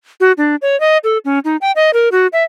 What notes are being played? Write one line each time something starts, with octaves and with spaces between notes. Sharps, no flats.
F#4
D4
C#5
D#5
A4
C#4
D#4
G5
D#5
A#4
F#4
E5